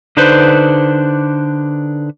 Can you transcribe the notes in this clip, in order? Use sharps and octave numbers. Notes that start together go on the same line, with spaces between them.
D3 D4 D#4 B4 C5